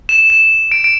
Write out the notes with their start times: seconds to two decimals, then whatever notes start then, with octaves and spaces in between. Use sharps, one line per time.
0.09 E7
0.30 E7
0.72 D7
0.84 D7